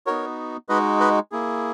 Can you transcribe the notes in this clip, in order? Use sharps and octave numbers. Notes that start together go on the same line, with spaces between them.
B3 D#4 F#4 A#4 C#5
G#3 D#4 F#4 B4 D#5
B4 D#5
A#3 E4 G#4